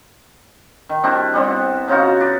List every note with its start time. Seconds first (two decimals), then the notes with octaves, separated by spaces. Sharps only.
0.89 D#3
1.03 G3 C4 D4 E4
1.34 G3 B3 C4
1.48 F#5
1.88 C#3 D#4 F4 F#4
2.20 B4 D5